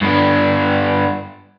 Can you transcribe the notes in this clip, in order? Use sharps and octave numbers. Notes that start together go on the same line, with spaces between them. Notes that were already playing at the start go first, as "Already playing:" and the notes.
G2 B3